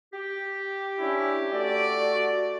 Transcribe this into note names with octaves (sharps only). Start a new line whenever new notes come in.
G4
C#4 D4 E4
A3 F#4 D5